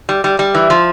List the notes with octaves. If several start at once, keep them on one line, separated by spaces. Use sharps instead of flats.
G3
G3
G3
E3
F3